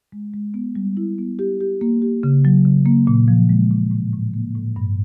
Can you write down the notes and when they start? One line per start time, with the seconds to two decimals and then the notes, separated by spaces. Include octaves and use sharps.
0.12 G#3
0.34 G#3
0.54 B3
0.76 G3
0.97 E4
1.18 B3
1.39 G4
1.61 G4
1.81 A#3
2.02 G4
2.23 C#3
2.45 F#3
2.65 C#3
2.86 A#3
3.07 A#2
3.28 F3
3.49 G#3
3.71 A#2
3.91 A2
4.13 A2
4.34 A#3
4.55 A2
4.76 G2